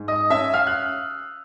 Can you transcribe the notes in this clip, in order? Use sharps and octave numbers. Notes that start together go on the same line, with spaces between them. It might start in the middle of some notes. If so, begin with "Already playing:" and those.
Already playing: G#2
D#5 D#6
C#4 E5 E6
F5 F6
F#6